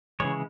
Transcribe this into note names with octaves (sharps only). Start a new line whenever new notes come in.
C#3 E3 G#3 C#5